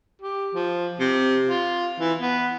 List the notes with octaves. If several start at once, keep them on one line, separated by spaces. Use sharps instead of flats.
G4
F3
C3
F4
E3
B3